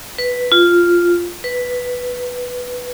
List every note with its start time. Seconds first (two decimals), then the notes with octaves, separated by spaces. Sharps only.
0.18 B4
0.52 F4
1.44 B4